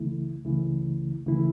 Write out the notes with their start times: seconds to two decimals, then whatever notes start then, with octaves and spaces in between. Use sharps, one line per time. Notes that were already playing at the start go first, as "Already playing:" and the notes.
Already playing: C#2 C#3 E3 A3 E4
0.45 C#2 C#3 E3 A3 E4
1.26 C#2 C#3 E3 A3 E4